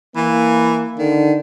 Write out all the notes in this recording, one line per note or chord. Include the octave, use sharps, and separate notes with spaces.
E3 A#3
D3 D#3